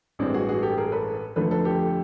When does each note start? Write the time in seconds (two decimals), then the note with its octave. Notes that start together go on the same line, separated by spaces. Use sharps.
0.19 A1 G2 E3 G#3 C4 D4
0.34 F#4 G#4
0.49 F#4 G#4
0.62 G4 A4
0.77 G#4 A#4
0.92 A4 B4
1.36 F2 D3 F3 A3 A4 B4
1.51 A4 B4
1.65 G4 A4